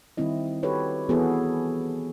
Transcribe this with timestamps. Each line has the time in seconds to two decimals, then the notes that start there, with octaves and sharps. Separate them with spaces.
0.17 D#3 G3 C4 E4 D#5
0.63 F#4 G4 A4 B4 C#5
1.09 E3 B3 F#4 G#4 A4 C#5